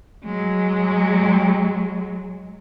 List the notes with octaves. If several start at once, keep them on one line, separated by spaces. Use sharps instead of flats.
F#3 G#3